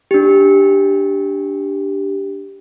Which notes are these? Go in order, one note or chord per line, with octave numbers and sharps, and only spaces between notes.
D4 G4